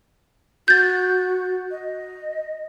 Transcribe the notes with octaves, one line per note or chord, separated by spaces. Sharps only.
F#4 G6 A6
D#5